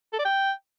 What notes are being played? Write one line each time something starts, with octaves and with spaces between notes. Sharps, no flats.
A4
D5
G5